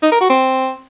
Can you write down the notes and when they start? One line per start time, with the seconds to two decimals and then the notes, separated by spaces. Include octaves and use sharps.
0.03 D#4
0.12 A#4
0.21 F#4
0.30 C4